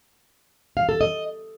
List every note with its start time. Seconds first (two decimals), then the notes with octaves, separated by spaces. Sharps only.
0.77 F5
0.89 A4
1.01 D#5